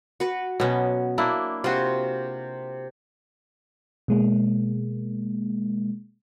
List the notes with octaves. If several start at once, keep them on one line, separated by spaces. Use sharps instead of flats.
F#4 B4
B2 F#3 B3 C#4
A#3 D4 E4
C3 F4 F#4 C6
B2 G#3 A#3